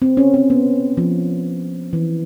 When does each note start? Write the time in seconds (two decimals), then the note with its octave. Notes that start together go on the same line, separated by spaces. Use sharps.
0.02 C4
0.17 C#4
0.34 C4
0.50 B3
0.97 F3
1.93 E3